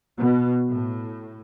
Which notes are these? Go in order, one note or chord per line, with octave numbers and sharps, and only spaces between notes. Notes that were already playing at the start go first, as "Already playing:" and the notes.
B2
A2